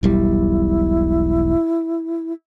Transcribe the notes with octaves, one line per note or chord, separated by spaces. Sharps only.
E1 B1 G3 E4